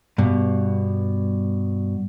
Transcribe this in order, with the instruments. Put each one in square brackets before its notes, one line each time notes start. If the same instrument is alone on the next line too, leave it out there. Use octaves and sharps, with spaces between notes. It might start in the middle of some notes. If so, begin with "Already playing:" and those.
[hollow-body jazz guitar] G2 B2